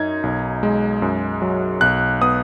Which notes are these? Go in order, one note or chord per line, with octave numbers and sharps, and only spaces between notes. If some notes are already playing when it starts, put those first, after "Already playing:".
Already playing: F#2 D#4 G#6
B1
G#3
F#2
F#3
B1 F#6
B3 D#6